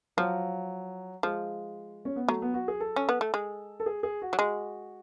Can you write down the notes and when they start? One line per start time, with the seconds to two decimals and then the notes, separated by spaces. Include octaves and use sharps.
0.17 F3 F#3
1.23 F3 G#3
2.05 C#4
2.16 B3
2.28 F#3 A3
2.42 B3
2.54 F#4
2.68 G#4
2.80 A4
2.96 C#4
3.09 B3
3.21 A3
3.34 G#3
3.80 A4
3.86 G#4
4.03 G#4
4.22 F#4
4.33 F#3
4.39 G#3 F#4